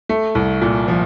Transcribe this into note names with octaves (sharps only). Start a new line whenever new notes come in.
A3
C2
A#2
F3